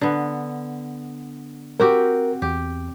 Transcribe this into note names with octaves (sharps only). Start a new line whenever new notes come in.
D3 B3
C4 F#4 G4 A#4
E2 G4